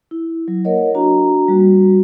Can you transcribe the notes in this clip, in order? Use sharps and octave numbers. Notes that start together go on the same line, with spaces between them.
E4
F#3
A#3 A#4 C#5 D#5 F#5
A#3 D4 F#4 A#5
G3 F#4